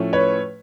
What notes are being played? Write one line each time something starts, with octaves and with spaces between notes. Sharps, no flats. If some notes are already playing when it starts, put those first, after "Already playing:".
Already playing: A2 F3 A3 C#4
B4 C#5